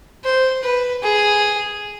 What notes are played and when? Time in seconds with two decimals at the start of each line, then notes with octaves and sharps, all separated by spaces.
0.24 C5
0.63 B4
1.03 G#4